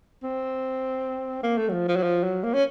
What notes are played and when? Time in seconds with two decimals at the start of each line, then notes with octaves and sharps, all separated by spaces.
0.23 C4
1.43 A#3
1.57 A3
1.69 F#3
1.73 F3
1.88 F3
1.96 F#3
2.03 F3
2.23 F#3
2.44 A#3
2.54 C#4